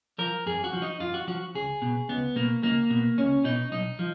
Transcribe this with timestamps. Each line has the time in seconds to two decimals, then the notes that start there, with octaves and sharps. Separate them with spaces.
0.18 F3 A#4
0.46 F2 G#4
0.64 F#4
0.73 F3
0.82 D#4
1.00 F2 F4
1.14 F#4
1.27 F3 F#4
1.54 C#2 G#4
1.82 B2
2.09 C#2 B3
2.36 B2 A#3
2.63 C#2 A#3
2.90 B2
3.18 C#2 C#4
3.44 B2 D#4
3.72 B1 D#4
3.99 F3